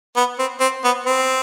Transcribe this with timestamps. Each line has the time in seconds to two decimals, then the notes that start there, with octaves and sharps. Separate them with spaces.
0.16 B3
0.39 C4
0.60 C4
0.84 B3
1.06 C4